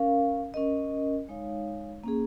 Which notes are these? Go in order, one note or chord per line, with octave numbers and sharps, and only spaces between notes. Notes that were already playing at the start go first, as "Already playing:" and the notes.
Already playing: C#4 A#4 F5
C#4 A#4 D#5
G#3 D#4 C#5 F5
A#3 C#4 G#4